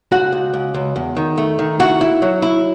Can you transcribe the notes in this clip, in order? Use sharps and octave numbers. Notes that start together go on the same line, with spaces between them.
C#2 F#4 F#5
C#2
C#2
C#2
E2
D#3
A3
D#3
E4 F#4 F#5
E4
F#3
E4